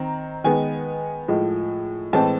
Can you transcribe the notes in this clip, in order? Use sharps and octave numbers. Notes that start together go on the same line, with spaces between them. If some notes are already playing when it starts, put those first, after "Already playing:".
Already playing: D#3 C4 A#5
D#3 G#3 B3 G#5
A2 F3 G#3
A2 E3 G#3 C4 A5